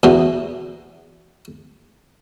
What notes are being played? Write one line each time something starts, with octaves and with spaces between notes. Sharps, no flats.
E2 B2